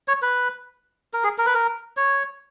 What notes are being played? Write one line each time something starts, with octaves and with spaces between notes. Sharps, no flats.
C#5
B4
A#4
G#4
A#4
B4
A#4
C#5